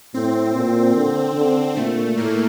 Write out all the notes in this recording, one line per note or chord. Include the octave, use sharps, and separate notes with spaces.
A2 C4
A#2
D3
D3
A#2 A3
A2 A#3